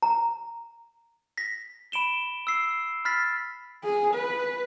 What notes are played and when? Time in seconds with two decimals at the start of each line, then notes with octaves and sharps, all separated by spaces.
0.02 A#5
1.37 A#6 B6
1.92 B5 D7 E7 G7
2.47 E6 C7
3.05 B5 F6 A6 B6 C7
3.84 G#4
4.14 B4